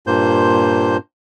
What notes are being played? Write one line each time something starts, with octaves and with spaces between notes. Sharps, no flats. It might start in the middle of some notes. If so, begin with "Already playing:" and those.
G2 A#2 A#3 C5 G6